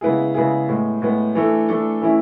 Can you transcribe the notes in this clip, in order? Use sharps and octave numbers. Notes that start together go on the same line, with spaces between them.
C#3 G#3 B3 E4 G#4
C#3 G#3 B3 E4 G#4
A2 G#3 B3
A2 G#3 B3
E3 A3 D4 A4
E3 A3 D4 A4
E3 A3 C#4 E4